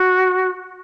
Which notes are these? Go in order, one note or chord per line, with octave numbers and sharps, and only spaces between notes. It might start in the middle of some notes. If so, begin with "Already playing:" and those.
Already playing: F#4